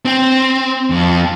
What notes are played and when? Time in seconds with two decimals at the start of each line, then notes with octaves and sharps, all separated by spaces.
0.05 C4
0.90 F2